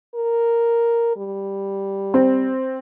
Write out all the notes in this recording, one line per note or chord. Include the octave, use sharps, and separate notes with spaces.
A#4
G3
C4